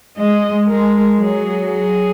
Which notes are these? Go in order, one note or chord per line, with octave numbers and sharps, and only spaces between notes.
G#3 D#5
G#3 A#4
F#3 G#4
G#4